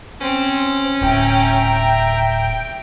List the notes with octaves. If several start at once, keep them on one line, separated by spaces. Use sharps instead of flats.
C4 C#4
D1 E5 G5 A#5 D7